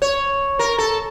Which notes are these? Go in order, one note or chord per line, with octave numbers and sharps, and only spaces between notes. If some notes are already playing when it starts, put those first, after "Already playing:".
C#5
A#4
A4